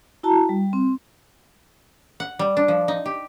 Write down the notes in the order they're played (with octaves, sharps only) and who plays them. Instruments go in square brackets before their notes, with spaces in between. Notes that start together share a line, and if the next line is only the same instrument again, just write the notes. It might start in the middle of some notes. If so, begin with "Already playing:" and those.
[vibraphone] E4 F#4 A5 A#5
G3
C4
[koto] F#5
G3
D4
F3
D#4
G4